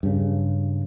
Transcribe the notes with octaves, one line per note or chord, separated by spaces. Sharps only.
G2 C#3